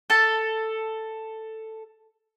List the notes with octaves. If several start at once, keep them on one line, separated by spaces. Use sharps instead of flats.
A4 A5